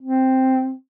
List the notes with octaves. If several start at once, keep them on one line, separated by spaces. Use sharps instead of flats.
C4